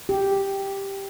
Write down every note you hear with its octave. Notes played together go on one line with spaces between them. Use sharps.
G4